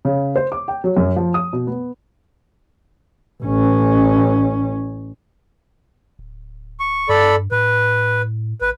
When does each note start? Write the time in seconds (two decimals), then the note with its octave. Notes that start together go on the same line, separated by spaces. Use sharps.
0.05 C#3
0.36 C5
0.52 D6
0.68 G5
0.84 F#3
0.97 F#2
1.16 F3
1.34 D#6
1.53 B2
1.67 B3
3.43 A1 C#4
6.19 D1
6.80 C#6
7.09 G2 A4 D5 B5
7.52 A2 B4
8.61 A1 B4